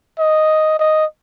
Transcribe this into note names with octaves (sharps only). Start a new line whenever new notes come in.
D#5
D#5